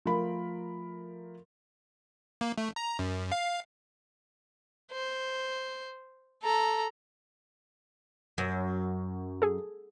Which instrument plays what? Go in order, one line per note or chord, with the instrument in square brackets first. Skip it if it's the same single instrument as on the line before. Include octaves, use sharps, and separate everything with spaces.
[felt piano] F3 A3 A#4 B5
[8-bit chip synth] A#3
A3
A#5
F#2
F5
[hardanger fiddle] C5
A4 A#5
[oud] F#2
[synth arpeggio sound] G#4 A4